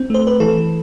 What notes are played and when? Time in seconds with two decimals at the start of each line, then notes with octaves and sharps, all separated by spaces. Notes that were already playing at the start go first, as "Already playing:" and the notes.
Already playing: C4
0.10 A3 C5
0.27 B4
0.40 E3 A4